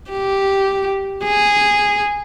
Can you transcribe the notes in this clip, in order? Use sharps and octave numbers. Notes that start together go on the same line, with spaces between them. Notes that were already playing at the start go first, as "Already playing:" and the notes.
G4
G#4